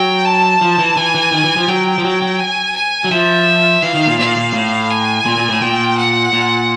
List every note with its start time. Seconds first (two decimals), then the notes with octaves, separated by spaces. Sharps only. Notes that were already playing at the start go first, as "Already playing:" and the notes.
Already playing: F#3 G5
0.25 A5
0.61 F3
0.78 E3
0.96 E3 G#5
1.15 E3
1.32 D#3
1.44 E3
1.57 F3
1.68 F#3 G5
1.98 F3
2.04 F#3
2.22 F#3
2.40 G#5
2.75 G#5
3.04 F#3
3.11 F3 E5
3.82 E3 F5
3.94 D#3
4.07 A#2
4.18 A#2 F5
4.37 A#2
4.54 A2
4.90 G#5
5.26 A#2
5.37 A#2
5.49 A2
5.61 A#2 G5
5.97 F#5
6.33 A#2